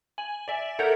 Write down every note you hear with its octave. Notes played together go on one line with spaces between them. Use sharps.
G#5 F#7
D5 E5
A4 A#4 C#5 E5 F#5 G6